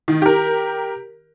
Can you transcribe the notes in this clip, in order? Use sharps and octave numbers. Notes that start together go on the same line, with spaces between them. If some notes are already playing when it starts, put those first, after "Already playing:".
D#3
G4 A#4